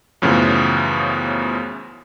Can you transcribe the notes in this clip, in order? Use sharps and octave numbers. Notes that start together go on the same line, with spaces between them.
F#2 A2 C#3 E3 F3 B3